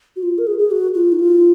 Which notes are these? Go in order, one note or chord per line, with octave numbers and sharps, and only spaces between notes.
F#4
F4
A#4
G#4
G#4
F#4
F4
D#4
F4